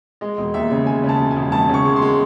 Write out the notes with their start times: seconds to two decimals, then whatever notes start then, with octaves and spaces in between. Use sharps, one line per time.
0.21 G#3 D#5
0.38 E1
0.54 D#2 E5
0.71 C#3
0.87 G#3 G#5
1.04 C#3
1.09 A5
1.20 E1
1.31 G#5
1.36 E1
1.52 E1 A5
1.69 C#3 C#6
1.85 G#3
1.96 C6
2.02 G#3